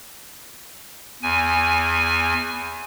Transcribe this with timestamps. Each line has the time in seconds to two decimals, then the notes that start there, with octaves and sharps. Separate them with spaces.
1.23 E2 G#5